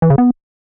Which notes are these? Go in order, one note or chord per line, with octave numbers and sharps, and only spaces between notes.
E3
C#3
B3